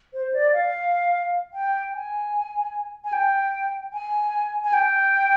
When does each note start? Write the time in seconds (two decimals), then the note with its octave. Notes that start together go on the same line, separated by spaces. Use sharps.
0.14 C5
0.33 D5
0.53 F5
1.54 G5
1.93 G#5
3.04 G#5
3.13 G5
3.93 G#5
4.64 G#5
4.73 G5